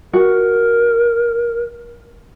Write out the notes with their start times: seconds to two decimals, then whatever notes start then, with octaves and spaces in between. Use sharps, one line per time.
0.13 F#4 A#4